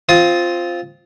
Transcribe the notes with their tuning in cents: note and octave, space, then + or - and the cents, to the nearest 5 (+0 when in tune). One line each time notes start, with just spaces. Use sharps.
C4 +0 F4 +0 D#6 +15